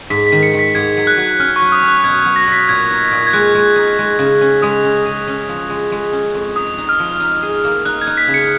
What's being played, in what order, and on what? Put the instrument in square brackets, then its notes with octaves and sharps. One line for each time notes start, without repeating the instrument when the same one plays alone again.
[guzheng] G#2 [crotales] B6
[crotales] B6
[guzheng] D#3
[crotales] C#7
[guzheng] D#3
[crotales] B6
[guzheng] G#2 [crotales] G#6
[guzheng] F#3
[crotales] F#6
[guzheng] F#3
[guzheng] C#4 [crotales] F6
[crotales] C#6
[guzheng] F#3
[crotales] D#6
[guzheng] C#4
[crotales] F#6
[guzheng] B2 [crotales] G#6
[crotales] G#6
[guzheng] F#3
[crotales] A#6
[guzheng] B2
[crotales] B6
[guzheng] A#2 [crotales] G#6
[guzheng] D#4
A#2
[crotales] G#6
[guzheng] G#3 [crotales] F#6
[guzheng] G#3
D#4
G#3
C#3
C#4
[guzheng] G#3 [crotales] D#6
[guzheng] C#4
G#4
C#4
F3
G#3
G#3
C#4
F2
[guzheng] D#4 [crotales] D#6
[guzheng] D#4
[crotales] F6
[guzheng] F3
D#4
G#4
A#3
[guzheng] D#4 [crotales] F#6
[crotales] G#6
[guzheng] D#4
[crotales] B6
[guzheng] C#3
[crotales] C#7